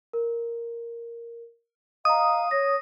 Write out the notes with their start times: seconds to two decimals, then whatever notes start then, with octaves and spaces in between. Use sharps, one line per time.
0.13 A#4
2.05 D#5 F5 A#5 D#6
2.51 C#5 A#6